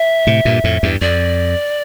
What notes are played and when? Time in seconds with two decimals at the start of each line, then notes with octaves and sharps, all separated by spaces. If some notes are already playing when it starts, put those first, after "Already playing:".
Already playing: E5
0.27 A2 C3
0.45 G2 A#2
0.64 F2 A2
0.83 E2 G2
1.01 F2 D5